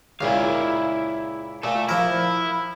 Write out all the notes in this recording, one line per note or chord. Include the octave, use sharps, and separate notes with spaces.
C#2 A#2 E4 F5
A#2 A4 E5
F3 E4 A#4